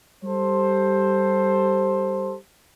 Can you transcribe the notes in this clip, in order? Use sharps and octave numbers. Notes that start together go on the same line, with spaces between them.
G3 G4 A4 C5